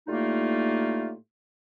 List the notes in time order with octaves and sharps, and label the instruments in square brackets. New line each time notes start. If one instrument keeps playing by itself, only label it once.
[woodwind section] A2 G3 A3 A#3 D#4 F4